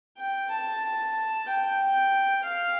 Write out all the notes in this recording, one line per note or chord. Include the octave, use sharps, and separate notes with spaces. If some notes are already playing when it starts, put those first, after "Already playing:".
G5
A5
G5
F5